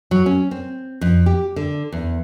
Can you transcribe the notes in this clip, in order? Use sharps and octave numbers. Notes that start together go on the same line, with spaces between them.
F#3
C#4
C4
F2
G4
D3
E2